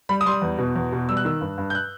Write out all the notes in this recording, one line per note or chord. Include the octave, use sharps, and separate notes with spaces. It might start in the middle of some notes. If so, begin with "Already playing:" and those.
G3 B5
D#6
G3 C6
D#6
E2
B2
E2
B2
G3 E6
F#6
D#3 E6
G2
G2
G6
F#6